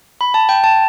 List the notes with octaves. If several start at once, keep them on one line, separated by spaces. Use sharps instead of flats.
B5
A5
G5
A5